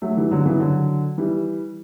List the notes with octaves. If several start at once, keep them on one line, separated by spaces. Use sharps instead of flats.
F#3 A3
E3 G3
D3 F#3
C#3 E3
D3 F#3
E3 G3